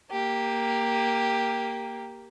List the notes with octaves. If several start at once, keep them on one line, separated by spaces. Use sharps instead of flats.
A#3 G4